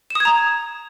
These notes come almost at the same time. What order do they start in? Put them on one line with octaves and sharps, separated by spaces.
E7 D#6 G#6 A#5